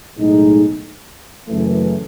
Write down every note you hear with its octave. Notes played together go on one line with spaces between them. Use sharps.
B1 A2 G#3 D#4
F#1 F#2 E3 A3